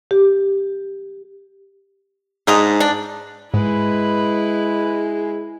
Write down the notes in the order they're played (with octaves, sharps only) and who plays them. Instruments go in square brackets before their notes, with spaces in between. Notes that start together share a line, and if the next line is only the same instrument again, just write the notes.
[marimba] G4
[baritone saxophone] G#2 [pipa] D4 D#5 A#5
[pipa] D4
[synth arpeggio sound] G#2 [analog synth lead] G#3 [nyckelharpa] E4 [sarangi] B4